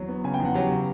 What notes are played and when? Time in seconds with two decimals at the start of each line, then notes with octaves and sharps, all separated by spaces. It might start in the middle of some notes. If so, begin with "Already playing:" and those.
Already playing: E2 F#3
0.09 B3
0.24 C#3 G#5
0.34 G5
0.40 E2
0.45 F#5
0.54 F#3 G4 G5
0.71 C#3